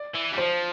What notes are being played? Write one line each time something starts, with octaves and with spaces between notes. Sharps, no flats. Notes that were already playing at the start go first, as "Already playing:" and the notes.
Already playing: D5
E3
G3
F3 C5